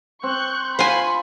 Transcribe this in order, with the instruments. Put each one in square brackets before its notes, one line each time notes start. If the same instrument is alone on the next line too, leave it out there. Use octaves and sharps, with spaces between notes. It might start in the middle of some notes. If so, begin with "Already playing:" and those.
[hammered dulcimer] C4 [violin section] C#6 F#6 G6
[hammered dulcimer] F4 [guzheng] C5 G#5 [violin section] B5 C#6